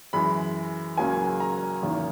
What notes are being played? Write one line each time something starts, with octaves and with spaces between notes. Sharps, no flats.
F#2 E3 G#3 B5
C#2 C#3 F#3 A#3 G#5
A#5
F#1 E2 D#3 A#3